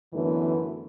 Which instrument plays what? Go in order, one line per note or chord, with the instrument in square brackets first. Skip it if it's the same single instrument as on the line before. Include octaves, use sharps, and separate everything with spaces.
[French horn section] F#2 D3 E3 A3 B3 C#4